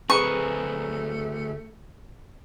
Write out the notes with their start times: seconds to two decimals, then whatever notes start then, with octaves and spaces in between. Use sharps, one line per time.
0.10 D2 A3 C4 G#4 A#4 B4 C#6